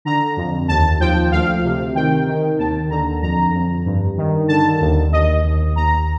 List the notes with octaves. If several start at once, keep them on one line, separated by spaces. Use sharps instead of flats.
D3 A#5
F2
D#2 A5
F3 G5
D2 F5
C3
D#3 G5
D#3
D#2 A5
D3 A#5
F2 A#5
F2
G2
D#3
D3 A5
D#2
D#2 D#5
D#2
D#2 A#5